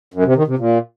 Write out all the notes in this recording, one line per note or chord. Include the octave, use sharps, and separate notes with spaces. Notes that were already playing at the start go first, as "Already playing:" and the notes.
F#2
C3
D#3
C3
A#2